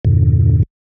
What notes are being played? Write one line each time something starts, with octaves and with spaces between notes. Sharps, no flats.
E2 G2 A#2 D3